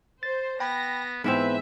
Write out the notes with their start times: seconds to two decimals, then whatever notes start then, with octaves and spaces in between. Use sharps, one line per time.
0.23 C5 A6
0.60 B3 G5 B5 A#6
1.24 G#2 E3 B3 C4 B4 C5 E5